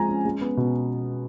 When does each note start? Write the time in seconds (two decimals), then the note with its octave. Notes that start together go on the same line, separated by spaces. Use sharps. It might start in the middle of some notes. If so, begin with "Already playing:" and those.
Already playing: F3 G#3 C4 G#5 A#5
0.09 C#4
0.25 G#3
0.41 B3
0.57 B2